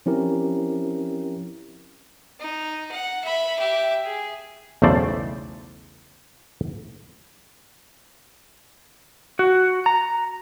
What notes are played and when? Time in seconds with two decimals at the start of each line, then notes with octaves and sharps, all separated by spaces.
0.06 F3 C4 C#4 E4 G4 A#4
2.40 D#4
2.92 F#5
3.24 E5 B5
3.59 G4 E5
4.04 G#4
4.82 B1 E2 C#3 A3 C5 D5
9.39 F#4
9.86 A#5